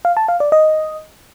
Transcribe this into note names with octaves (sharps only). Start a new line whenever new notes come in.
F5
A5
F5
D5
D#5